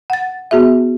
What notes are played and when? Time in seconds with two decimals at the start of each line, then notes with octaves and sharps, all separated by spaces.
0.10 F#5 A6
0.51 B3 F#4 G#4 E5